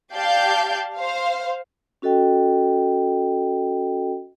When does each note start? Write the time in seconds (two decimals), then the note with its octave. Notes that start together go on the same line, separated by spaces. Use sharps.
0.13 G4 D5 F5 A5 G6
0.97 C5 F5
2.02 C#4 F#4 A4 D#5 G5